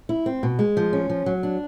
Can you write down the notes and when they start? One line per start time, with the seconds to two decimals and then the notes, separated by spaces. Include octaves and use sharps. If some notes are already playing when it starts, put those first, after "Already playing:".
0.09 E4
0.26 C4
0.43 B2
0.59 G#3
0.77 F3
0.93 C#4
1.10 F3
1.26 F#3
1.43 D4